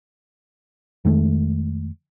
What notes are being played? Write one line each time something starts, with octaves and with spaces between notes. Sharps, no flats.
F2 D#3 G#3 A3